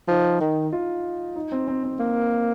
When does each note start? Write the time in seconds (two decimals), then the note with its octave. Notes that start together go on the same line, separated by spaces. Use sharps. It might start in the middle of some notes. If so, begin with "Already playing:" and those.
0.08 F3 D#4
0.40 D#3
0.73 F4
1.36 D#4
1.52 C4
1.68 C4
1.83 C4
1.99 A#3